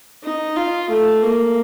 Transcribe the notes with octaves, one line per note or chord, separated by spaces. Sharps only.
D#4
F4
A3
A#3